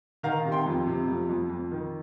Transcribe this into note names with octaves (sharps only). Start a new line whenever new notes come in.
D#3 F5 A#5
C3
G5 C6
F2
C3
F2
F2
F2
D#3